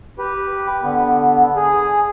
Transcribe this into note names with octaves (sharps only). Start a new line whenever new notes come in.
G4 B4
D3 B3
G#4